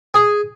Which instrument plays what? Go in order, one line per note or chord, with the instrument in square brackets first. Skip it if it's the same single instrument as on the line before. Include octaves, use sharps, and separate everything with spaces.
[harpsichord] G#4